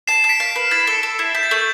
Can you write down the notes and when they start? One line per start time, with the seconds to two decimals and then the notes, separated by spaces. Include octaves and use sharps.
0.08 A5 C7 E7
0.24 A5
0.29 B6 D7
0.40 F5
0.51 B4 B6
0.71 E4 A6
0.87 A4
1.03 A4
1.19 E4
1.35 E4 G6
1.43 A6
1.50 A3 G6